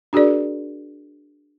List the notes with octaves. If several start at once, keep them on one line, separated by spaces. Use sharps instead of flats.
D4 F#4 G#4 A#4 D5